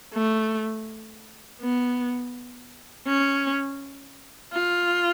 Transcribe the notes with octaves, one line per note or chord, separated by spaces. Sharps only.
A3
B3
C#4
F4